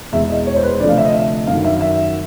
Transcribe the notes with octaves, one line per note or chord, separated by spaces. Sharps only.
E2 B2 G#3 E5
D#5
C#5
C5
B4
D2 C3 F3 A3 D5
F5
E5
D#5
E5
F#2 D#3 F#3 F5
E5
E5